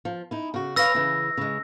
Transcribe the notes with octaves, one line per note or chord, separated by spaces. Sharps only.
F3
D#4 E4
C#3 F#4
B4 C#5 F5 E6 A#6
C#3 E3
C#3 G#3